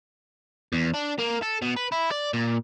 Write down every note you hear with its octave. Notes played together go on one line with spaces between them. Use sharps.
E2
D4
A#3
A4
B2
B4
E4
D5
A#2